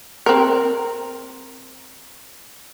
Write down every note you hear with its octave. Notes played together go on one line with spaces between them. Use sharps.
C4 A#4